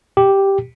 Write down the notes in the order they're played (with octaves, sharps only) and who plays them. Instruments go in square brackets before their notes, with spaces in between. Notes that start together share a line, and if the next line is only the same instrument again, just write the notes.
[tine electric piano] G4